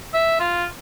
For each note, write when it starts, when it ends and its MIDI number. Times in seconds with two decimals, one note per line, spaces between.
0.14 0.39 76
0.40 0.65 65